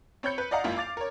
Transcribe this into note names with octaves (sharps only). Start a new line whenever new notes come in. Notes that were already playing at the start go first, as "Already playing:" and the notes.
C4 C#5 B5 G6 C#7
B4
D5 D#5 F5 F#5 A#5
G#1 F#2 A#3 E4 F4
F5 D6 A6 F7
A#4 C#5